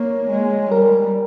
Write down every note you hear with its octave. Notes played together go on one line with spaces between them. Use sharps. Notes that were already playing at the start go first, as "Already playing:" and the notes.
Already playing: A#3 C#5
G#3
G3 A#4